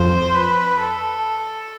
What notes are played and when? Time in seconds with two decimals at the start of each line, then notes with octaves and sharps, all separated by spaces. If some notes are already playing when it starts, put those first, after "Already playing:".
Already playing: F2 F3 C5
0.35 B4
0.80 A4